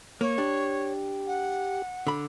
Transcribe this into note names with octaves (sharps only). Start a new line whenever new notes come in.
A#3 C#5
D4 G4
F#5
D3 B5